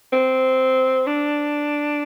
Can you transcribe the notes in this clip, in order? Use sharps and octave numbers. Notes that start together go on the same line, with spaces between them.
C4
D4